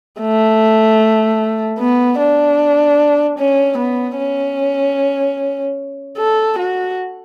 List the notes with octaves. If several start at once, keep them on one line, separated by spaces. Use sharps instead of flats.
A3
B3
D4
C#4
B3
C#4
A4
F#4